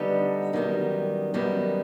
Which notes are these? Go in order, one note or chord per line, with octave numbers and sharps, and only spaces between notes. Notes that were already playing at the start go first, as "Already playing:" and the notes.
Already playing: D3 G3 B3 D#4
F#2 D#3 G3 B3
F#2 D#3 G3 B3